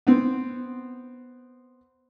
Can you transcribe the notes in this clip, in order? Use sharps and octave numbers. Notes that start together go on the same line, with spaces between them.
B3 C4